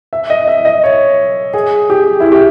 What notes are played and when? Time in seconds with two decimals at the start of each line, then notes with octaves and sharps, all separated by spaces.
0.13 E5
0.30 D#5
0.48 E5
0.65 D#5
0.84 C#5
1.54 G#4
1.90 G4
2.20 E4
2.32 G4